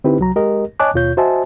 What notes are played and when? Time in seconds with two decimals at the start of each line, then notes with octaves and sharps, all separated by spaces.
0.04 D3 C4 D#4 E4 G4 B4
0.19 C2 F#3 A#5
0.36 G#3 G4 A#4 D#5
0.80 C#5 D#5 G#5 A5 D6 F#6
0.94 D#2 B2 F4 C#5 G6
1.17 F#4 C5 D#5 E5 G#5 A5